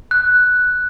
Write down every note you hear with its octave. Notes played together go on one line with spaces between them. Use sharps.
F#6